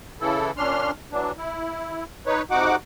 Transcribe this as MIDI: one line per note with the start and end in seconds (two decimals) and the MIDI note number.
0.21 0.51 49
0.21 0.51 52
0.21 0.51 64
0.21 0.51 69
0.57 0.91 46
0.57 0.91 61
0.57 0.91 62
0.57 0.91 84
0.57 0.91 89
1.12 1.31 52
1.12 1.31 54
1.12 1.31 62
1.38 2.04 64
2.26 2.42 63
2.26 2.42 71
2.26 2.42 73
2.51 2.76 41
2.51 2.76 48
2.51 2.76 63
2.51 2.76 66
2.51 2.76 78
2.51 2.76 86